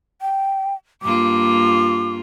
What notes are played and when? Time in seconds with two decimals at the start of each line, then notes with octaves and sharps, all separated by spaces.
0.21 G5
1.02 G2 A#3 F4 D6